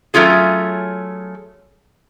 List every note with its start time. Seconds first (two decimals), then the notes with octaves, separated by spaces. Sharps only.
0.14 F#3 A3 C#4 F4 G#4